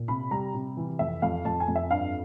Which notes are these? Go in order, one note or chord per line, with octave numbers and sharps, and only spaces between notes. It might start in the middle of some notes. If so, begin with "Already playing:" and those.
Already playing: A#2
C3 B5
G3 A#5
C3
E3
F2 E5
F2 F5
F2 A5
G#5
F2
E5
G2 F5